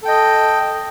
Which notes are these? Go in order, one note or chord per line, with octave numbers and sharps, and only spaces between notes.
A4 D#5 G5